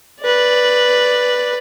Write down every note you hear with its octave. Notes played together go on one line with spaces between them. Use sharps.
B4 D5